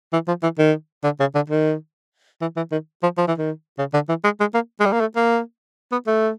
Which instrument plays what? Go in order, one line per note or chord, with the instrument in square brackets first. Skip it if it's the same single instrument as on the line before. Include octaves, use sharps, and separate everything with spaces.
[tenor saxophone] E3
F3
E3
D#3
D3
C#3
D3
D#3
E3
E3
D#3
F3
F3
E3
D#3
C#3
D3
E3
G#3
G#3
A#3
G#3
G3
A#3
A3
A#3
B3
A3